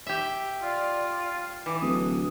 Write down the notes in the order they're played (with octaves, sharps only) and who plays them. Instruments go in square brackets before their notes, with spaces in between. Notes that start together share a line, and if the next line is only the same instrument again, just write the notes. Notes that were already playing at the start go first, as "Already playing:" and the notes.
[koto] G4 E5
[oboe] F4 [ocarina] D5
[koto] E3 [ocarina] D6
[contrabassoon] D1 [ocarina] B4 [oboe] D#6